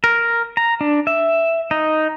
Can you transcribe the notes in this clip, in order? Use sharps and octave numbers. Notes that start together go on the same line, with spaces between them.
A#4
A#5
D4
E5
D#4